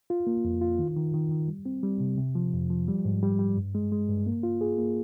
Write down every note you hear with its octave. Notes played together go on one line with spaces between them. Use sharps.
F4
A#3
F2
F4
D#3
D#3
D#3
D#3
G3
C4
G3
C3
C3
F3
F2
F3
G3
G#2
G3
G3
G2
G#3
G#3
G2
A#3
F4
G#4
A#3